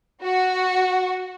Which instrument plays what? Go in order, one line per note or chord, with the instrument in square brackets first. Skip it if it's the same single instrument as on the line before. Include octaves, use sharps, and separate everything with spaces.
[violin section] F#4